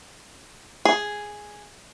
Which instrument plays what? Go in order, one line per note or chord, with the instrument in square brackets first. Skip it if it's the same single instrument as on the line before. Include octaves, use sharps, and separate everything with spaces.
[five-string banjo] G#4